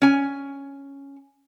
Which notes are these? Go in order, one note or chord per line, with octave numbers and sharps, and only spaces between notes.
C#4 G#5